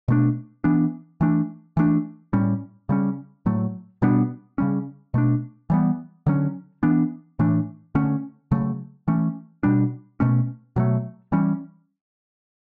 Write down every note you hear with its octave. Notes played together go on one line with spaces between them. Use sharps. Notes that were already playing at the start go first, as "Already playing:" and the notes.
B2 A3 D4
E3 B3 D4
E3 A3 D4
E3 A3 D4
A2 G3 C#4
C#3 G3 C#4
A2 F#3 A3
B2 G3 B3 D4
C#3 G3 C#4
B2 A3 D4
E3 G3 B3
D3 F#3 C#4
E3 B3 D4
A2 E3 A3 D4
D3 A3 C#4
C#3 F#3 A3
E3 A3 C#4
B2 G3 D4
B2 A3 C#4
B2 F#3 A3
E3 G3 C#4